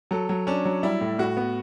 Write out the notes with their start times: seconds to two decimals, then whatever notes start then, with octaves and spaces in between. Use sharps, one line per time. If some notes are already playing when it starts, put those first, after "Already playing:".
0.11 F#3 A4
0.29 F#3
0.47 C#4 D4
0.65 F#3
0.83 G3 E4
1.01 A2
1.18 A2 F#4
1.37 B3